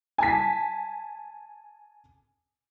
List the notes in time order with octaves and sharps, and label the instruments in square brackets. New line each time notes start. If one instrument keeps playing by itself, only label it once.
[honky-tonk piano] G#5 A5 B6